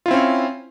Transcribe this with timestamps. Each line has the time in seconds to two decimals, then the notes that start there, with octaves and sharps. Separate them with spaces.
0.06 F4
0.08 E4
0.11 C4
0.13 C#4